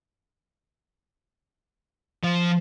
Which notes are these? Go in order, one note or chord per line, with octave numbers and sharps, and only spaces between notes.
F3